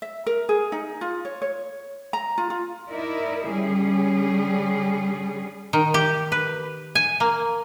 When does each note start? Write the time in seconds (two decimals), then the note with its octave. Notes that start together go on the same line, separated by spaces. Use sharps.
0.02 E5
0.26 A#4
0.49 G#4
0.72 D#4
1.01 F4
1.25 C#5
1.42 C#5
2.13 A#5
2.38 F4
2.50 F4
2.89 D#4 E4 A#4 D5 E5
3.49 D3 G3 C#4 G#4
5.73 D#3
5.94 G4
6.32 B4
6.95 G#5
7.20 A#3